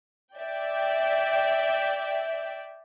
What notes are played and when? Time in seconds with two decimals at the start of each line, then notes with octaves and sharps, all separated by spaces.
0.35 D5 E5 G5